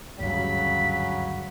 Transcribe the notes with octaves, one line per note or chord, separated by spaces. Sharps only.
G#1 D2 G2 C#3 F#3 B5